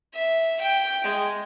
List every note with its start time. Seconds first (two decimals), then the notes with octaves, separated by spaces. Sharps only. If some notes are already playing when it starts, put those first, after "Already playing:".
0.14 E5
0.60 G5
1.04 G#3